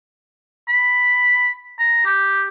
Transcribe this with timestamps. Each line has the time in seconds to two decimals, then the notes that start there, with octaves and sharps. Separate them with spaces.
0.68 B5
1.79 A#5
2.05 G4